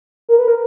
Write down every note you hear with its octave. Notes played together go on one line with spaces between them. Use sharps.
A#4
B4
A#4